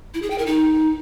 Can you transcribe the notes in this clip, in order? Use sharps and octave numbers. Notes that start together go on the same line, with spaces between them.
E4
G#4
G5
A#4
D#4